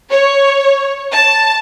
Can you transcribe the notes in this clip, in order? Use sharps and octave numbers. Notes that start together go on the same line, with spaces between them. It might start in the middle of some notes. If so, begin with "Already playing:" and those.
C#5
A5